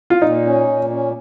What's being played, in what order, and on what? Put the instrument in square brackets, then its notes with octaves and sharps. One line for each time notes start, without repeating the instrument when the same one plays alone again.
[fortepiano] F4
[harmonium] A#2 [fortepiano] D#4
[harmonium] C#4
A#2
C#4